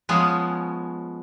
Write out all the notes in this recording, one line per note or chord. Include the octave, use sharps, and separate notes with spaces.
F3 G#3 B3 C#4